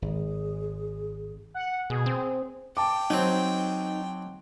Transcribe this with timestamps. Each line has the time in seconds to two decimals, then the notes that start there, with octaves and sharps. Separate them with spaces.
0.02 G#1 G#4
1.54 F#5
1.90 B2 G#4
2.06 C4
2.77 G5 A5 D6
3.10 F#3 C4 D#4